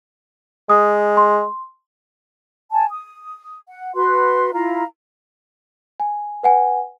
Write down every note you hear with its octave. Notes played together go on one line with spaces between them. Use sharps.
G#3 D#6
C6
G#5 A5
D#6
F#5
F#4 B4 C6
E4 F4 F5 A#5
G#5
B4 F#5 G#5